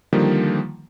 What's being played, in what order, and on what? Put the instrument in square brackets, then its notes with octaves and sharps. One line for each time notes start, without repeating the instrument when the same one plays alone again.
[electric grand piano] D3 D#3 F3 G3 A#3